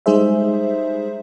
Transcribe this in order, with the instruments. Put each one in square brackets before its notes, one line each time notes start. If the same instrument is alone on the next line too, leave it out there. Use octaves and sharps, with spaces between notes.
[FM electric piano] G3 G#3 D#4 G#4 C5 E5